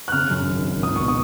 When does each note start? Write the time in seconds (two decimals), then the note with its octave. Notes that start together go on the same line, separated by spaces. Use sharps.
0.08 F#6
0.12 C#3 F6
0.30 F#2
0.47 G#1
0.65 G#1
0.83 C#2 D#6
0.96 B2 C#6
1.08 D#6